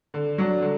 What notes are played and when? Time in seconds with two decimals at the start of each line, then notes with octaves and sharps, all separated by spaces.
0.14 D3
0.38 F#3 D4
0.62 D3